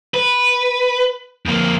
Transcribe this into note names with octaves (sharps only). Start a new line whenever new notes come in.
B4
F2 A#3